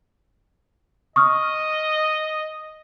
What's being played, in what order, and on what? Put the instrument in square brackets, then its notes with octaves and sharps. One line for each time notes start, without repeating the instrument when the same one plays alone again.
[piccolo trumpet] D#5 [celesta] C#6 D#6 F6